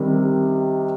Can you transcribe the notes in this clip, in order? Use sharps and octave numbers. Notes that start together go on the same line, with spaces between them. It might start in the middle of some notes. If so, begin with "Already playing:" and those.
Already playing: C3 D#3 G3